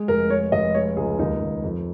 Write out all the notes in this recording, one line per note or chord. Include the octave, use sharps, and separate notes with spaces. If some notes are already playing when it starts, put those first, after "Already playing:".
Already playing: G#3
F1 A#4
G#3 C#5
F1 D#5
G#3 C#5
C#2 G#4
D#2 D#4
D#2
F2